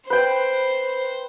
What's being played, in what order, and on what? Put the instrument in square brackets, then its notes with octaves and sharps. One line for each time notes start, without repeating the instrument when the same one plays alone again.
[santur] B4 G5 [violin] C5